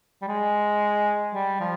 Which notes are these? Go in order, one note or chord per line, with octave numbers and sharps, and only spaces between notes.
G3
G#3
G3
F3